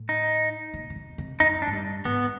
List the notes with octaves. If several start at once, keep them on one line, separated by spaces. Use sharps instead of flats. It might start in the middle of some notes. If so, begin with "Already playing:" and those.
Already playing: A2
D#4
A#2
C3
B2
C3
F#2 D#4
D4
G#2
G2
G#2 B3